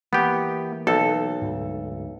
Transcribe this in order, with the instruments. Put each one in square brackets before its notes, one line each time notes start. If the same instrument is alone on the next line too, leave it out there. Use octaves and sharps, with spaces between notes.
[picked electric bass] E3 A#3 [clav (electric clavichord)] B3 G4
[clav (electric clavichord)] B1 [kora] A4
[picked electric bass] D2 G#2